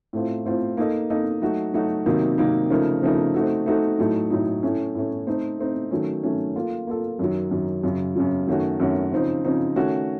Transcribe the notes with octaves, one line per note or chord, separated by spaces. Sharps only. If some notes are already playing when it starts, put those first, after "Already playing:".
A2 A3 C4 F4
A2 A3 C4 F4
A#3 D#4 A4 D#5
A#3 D#4 A4 D#5
F#3 A3 D#4 F#4
F#3 A3 D#4 F#4
C3 D#3 F#3 A#3 D#4
C3 D#3 F#3 A#3 D#4
C#3 F3 A3 D#4 A#4
C#3 F3 A3 D#4 A#4
A3 C4 D#4 F#4 A4
A3 C4 D#4 F#4 A4
A2 F#3 A3 D#4
A2 F#3 A3 D#4
A2 A3 C#4
A2 A3 C#4
A3 C4 D#4
A3 C4 D#4
D#3 F#3 A3 C#4
D#3 F#3 A3 C#4
A#3 F4 A4
A#3 F4 A4
F#2 D#3 F#3
F#2 D#3 F#3
F#2 C#3 F#3
F#2 C#3 F#3
F#2 D#3 A3 C#4 F#4
F#2 D#3 A3 C#4 F#4
C#3 F3 C4 D#4
C#3 F3 C4 D#4
D#3 A3 C#4 F#4